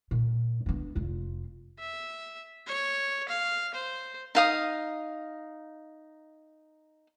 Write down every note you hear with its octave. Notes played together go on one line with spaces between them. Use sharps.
A#2
B3 D4
F1 F4
E5
C#5
F5
C5
D#4 F5 D#6